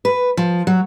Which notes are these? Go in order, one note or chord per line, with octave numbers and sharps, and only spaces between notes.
B4
F3
F#3